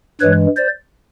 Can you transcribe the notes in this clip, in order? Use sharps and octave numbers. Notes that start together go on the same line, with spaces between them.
G2 E3 G#3 B4 C#5
C5 D5